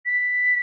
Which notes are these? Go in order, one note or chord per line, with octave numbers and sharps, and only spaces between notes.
B6